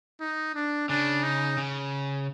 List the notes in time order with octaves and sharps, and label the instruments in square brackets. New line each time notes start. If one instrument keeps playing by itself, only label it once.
[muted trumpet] D#4
D4
[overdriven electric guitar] C#3 [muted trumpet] D4
[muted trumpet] D#4
[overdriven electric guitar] C#3